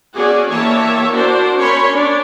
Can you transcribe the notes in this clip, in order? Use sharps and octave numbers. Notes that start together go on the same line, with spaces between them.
C#4 F#4 G#4 D5
E3 A#3 G4 C#5 E5 A5
D4 F#4 A#4 C5
C#4 A#4 C#5 B5 C6
D4